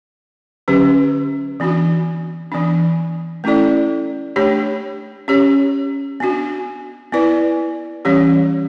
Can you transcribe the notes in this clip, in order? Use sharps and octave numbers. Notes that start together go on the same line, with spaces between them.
D3 F#3 C#4 G4 B4
E3 B3 D4 F#4
E3 B3 D4
A3 C#4 E4 A4 D5
A3 D4 G4 C#5
C#4 G4 C#5
B3 D4 F#4
B3 E4 B4 D5
E3 G3 C#4 G4 C#5